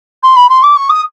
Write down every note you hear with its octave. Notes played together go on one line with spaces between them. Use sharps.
C6
B5
C6
D6
C#6
D#6